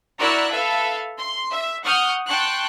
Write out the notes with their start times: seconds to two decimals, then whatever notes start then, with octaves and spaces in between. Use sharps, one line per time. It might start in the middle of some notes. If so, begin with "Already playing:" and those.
0.19 E4 F#4 A#4 D5 E6 F#6
0.50 A4 B4 E5 F5
1.18 C6
1.52 E5
1.84 F#5 C#6 D#6 F6 G6
2.27 G5 A5 C6 C#6 F#6